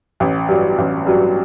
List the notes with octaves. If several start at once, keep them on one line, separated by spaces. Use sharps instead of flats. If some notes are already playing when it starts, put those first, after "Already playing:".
A1
G2 F#3
A1
G2 F#3